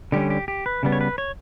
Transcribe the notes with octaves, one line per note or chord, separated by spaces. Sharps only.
D3 G3 C#4 G4
G4
G4
B4
C#3 G3 B3
C#5
B4
C#5